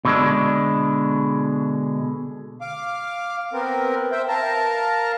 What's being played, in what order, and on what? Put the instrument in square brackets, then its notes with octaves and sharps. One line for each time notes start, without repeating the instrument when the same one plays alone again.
[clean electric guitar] B2 D3 G#3 D4
[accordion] F5 D6
B3 C4 A#4
C5 E5 G5
A#4 F5 A5 A#5